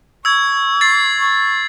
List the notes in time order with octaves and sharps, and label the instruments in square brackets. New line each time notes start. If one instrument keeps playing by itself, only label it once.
[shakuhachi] C#6 [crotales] E6 G#6
[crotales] A6 C7
[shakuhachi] C#6